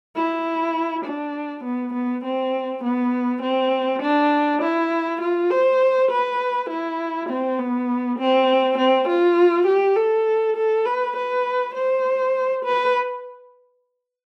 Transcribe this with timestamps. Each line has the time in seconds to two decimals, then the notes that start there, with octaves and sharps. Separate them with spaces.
0.16 E4
1.05 D4
1.64 B3
1.93 B3
2.24 C4
2.84 B3
3.42 C4
4.02 D4
4.62 E4
5.21 F4
5.51 C5
6.11 B4
6.69 E4
7.29 C4
7.59 B3
8.18 C4
8.78 C4
9.08 F4
9.67 G4
9.96 A4
10.56 A4
10.86 B4
11.16 B4
11.75 C5
12.65 B4